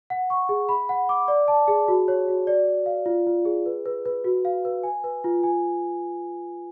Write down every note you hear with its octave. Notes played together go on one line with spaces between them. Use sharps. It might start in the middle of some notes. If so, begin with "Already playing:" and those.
F#5
C#6
G#4
B5
F#5
D6
D5
A5
G#4
F#4
C#5
F#4
D5
D5
F5
F4
F4
G#4
B4
B4
B4
F#4
F5
B4
G#5
B4
F4
G#5